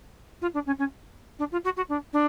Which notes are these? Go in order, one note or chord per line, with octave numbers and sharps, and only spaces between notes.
F4
D4
C#4
C#4
D4
F4
F#4
F#4
D4
D4